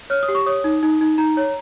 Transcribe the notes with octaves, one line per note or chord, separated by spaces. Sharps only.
C#5 F6
D#6
G4
C#6
C#5 D#6
D#4
D#4
D#4
D#4 A#5
C#5